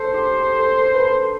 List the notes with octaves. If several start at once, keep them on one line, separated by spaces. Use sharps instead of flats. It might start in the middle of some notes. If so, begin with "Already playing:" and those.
Already playing: A4 C5
G4
G4
A4
A4
B4
A4